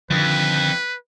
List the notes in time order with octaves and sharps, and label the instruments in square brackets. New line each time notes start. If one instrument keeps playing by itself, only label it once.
[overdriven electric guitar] F2 [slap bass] D3 D#3 F3 [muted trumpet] B4